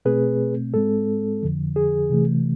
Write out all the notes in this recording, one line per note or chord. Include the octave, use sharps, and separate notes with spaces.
B2 A3 C4 G#4 B4
G#2 G#3 C4 A4
F2 D3 F3
G#4
C3 E3 A3